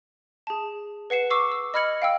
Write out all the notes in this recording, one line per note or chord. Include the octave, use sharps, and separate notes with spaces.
G#4 A5
B4 F#5 C7 E7
C#6 D6 E6 C7
E6
D#5 B5 F6 G#6 C#7 F#7
F5 G5 E6